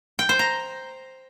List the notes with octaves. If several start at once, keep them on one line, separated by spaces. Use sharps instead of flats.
G5
C5
A#5